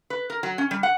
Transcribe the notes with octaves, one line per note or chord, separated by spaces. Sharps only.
B4
A#4
F#3
C#4
G3
F#5